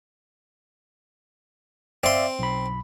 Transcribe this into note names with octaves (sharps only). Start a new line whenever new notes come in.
C4 D5 E5 F5 C6
B1 B5